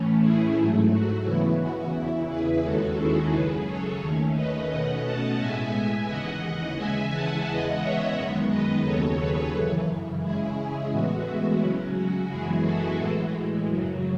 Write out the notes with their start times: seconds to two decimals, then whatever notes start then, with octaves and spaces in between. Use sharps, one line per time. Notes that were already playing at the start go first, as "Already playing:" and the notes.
Already playing: A2 E3 A3 C#4
0.21 E4 G#4
0.56 G#2 F#3 A3
0.91 F#4
1.24 C#3 E3 B3 E4
1.60 F#4
1.94 E2 C#3 E3 E4
2.28 G#4 B4
2.63 D#2 D#3 G#3 C#4 F#4 A4
2.98 E4 G#4
3.32 F#2 C#3 F#3 G#4 B4
3.66 A4 C#5
4.01 D#2 D#3 A3 C#4
4.35 B4 D#5
4.70 B2 A3 C#4 D#5 F#5
5.04 F#5 A5
5.39 A2 G#3 B3 E5 G#5
6.08 D#2 C#3 E3 D#5 F#5
6.77 C#3 E3 G#3 E5 G#5
7.12 F#5 A5
7.46 E2 C#3 G#3 B3 D#5 F#5
7.81 C#5 E5
8.15 F#2 D#3 G#3 B3
8.49 B4 D#5
8.84 D#2 C#3 F#3 A4 C#5
9.19 G#4 B4
9.53 F#2 C#3 E3
10.22 C#3 G#3 C#4 E4 G#4
10.91 A2 E3 G#3 B3 F#4
11.25 E4
11.61 C#3 F#3 C#4
11.95 F#4
12.29 F#2 E3 G#3 B3 E4 G#4
12.63 F#4 A4
12.99 A2 E3 G#3
13.68 F#2 C#3 F#3